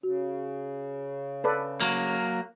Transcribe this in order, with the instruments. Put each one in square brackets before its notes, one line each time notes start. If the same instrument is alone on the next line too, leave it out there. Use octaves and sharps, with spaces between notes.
[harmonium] C#3 [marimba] F#4
[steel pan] A4 B4 D5
[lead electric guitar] F#3 A#3